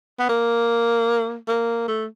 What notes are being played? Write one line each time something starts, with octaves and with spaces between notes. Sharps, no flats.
B3
A#3
A#3
A3